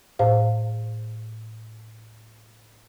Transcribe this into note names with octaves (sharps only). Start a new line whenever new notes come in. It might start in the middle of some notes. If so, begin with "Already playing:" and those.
A2 C5 F5